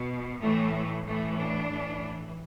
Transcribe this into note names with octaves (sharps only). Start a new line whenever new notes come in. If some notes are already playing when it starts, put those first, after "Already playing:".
Already playing: B2
A2 E3 A3
A2 E3 A3
D4
A2 E3